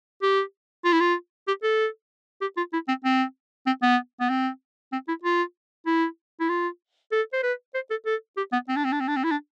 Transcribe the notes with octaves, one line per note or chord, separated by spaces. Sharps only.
G4
F4
E4
F4
G4
A4
G4
F4
E4
C4
C4
C4
B3
B3
C4
C4
E4
F4
E4
E4
F4
A4
C5
B4
C5
A4
A4
G4
B3
C4
D4
C4
D4
C4
D4
C4
E4
D4